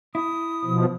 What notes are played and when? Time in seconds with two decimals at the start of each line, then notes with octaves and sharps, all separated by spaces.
0.15 E4 D#6
0.65 B2 F3